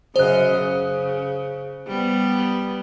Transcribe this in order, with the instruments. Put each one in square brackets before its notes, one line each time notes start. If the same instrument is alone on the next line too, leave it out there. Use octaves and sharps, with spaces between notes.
[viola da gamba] F#2 C#3 D#5 [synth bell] C5 F#6
[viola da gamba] C#3
G3 B3